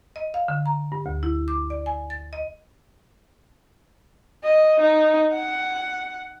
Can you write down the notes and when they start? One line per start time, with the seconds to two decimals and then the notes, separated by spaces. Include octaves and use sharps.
0.16 D#5
0.34 F5
0.48 D3
0.66 A#5
0.92 G2
1.06 D2
1.23 E4
1.48 D6
1.70 D5
1.86 G#5
2.10 A6
2.33 D#5
4.43 D#5
4.81 D#4
5.33 F#5